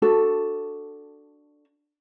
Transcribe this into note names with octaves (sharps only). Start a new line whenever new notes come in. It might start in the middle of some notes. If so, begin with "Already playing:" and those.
D4 F#4 A4